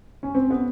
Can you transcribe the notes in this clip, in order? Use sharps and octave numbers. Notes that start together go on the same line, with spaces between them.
C#4
C4
B3